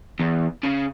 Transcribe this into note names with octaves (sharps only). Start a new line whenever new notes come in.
E2
C#3